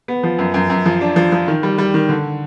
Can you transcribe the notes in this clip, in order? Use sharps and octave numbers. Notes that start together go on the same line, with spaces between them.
B3
F3
F#2
F#2
F#2
F3
D4
F3
F3
D#3
G3
G3
D#3
D3